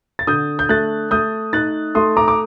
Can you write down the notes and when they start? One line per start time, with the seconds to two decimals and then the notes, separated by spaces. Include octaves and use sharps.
0.19 A6
0.27 D3 D#6 G6
0.59 G6
0.69 A3 F#6 A6
1.11 A3 D#6 G6
1.53 D#4 F#6 A6
1.95 A3 C6 D#6
2.17 A#5 D6
2.28 D6